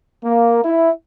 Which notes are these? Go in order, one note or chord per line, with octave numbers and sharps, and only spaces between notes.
A#3
E4